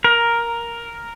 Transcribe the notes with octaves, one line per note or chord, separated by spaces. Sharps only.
A#4